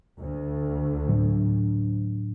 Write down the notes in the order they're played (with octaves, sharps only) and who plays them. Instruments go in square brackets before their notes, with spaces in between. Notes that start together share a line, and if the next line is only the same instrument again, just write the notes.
[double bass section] D2
[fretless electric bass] A2 F#3 D4